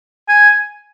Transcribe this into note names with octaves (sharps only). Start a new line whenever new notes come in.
G#5